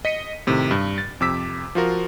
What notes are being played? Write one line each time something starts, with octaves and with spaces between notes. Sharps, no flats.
D#5 B6 C#7 D#7
A2 C3 D#3
G2
A6
F2 C3 D6 E6 B6
F3 F4 F#4 A#4